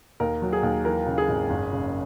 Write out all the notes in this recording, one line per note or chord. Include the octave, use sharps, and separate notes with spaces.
D#2 A#4
F#3
G#4
D#2
E3 A#4
C#3
G#4
G#1
F#1
C#3